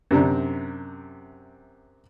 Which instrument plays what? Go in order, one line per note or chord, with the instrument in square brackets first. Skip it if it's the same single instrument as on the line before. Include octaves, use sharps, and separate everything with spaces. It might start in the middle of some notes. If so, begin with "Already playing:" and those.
[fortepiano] F#2 C3 D4 A#5